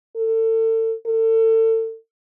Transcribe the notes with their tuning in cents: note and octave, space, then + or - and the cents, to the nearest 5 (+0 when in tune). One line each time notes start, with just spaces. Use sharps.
A4 +35
A4 +35